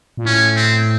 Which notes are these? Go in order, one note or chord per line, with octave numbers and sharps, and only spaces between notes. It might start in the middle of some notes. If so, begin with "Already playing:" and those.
A#2
A2 C#4
C4